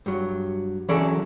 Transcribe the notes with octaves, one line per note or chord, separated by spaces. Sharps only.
G2 F#3
E3 F#3 C#4 G#4 A4 D5